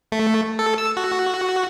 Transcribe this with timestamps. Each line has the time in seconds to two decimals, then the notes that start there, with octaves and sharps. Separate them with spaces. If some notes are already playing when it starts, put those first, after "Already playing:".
0.12 A3
0.59 A4
0.78 E6
0.97 F#4